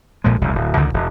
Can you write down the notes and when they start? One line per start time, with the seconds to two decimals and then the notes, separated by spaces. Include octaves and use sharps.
0.24 A#1 A#2 F3 G#3
0.41 E1 C2
0.55 D1
0.77 C#2 D3 D#3
0.94 E1